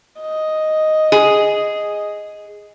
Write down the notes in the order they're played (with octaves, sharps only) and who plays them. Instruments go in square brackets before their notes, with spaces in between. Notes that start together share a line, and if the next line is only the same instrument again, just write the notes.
[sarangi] D#5
[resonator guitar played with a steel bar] G#4